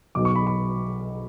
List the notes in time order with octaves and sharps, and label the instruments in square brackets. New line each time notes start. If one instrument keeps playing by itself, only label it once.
[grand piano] B1 B2 F#3 D6
C#6
B5
B5